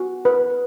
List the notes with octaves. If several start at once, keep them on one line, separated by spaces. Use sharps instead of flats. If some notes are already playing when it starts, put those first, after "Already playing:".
Already playing: F#4
B4